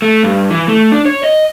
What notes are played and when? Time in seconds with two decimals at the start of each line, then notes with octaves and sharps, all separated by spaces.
0.02 A3
0.23 G2
0.51 E3
0.68 A3
0.92 D4
1.06 C#5
1.23 D#5